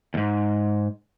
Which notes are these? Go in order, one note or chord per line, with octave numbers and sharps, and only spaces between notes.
D#2 G#2